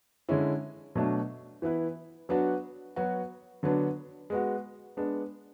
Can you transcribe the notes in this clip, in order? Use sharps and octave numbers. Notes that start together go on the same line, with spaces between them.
D3 G#3 C#4 E4
B2 F#3 A3 D4
E3 B3 E4 B4
F#3 B3 D4 F#4
F#3 B3 F#4
D3 F#3 B3 D4
G#3 B3 F#4
G#3 B3 D4